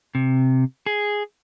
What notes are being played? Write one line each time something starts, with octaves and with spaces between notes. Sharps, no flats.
C3
G#4